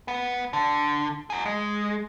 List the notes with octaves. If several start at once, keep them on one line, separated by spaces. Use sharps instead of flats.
B3
D3
F#4 G#4
G#3